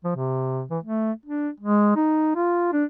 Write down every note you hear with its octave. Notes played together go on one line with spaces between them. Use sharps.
F3
C3
E3
A3
D4
G#3
D#4
F4
D4